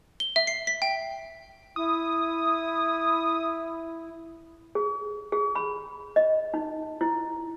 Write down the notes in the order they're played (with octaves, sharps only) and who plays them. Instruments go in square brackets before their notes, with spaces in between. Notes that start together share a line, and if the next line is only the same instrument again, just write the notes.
[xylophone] G7
E5
C7
B6
G5
[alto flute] E4 [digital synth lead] D#6
[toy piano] G#4
G#4
B5
D#5
D#4
E4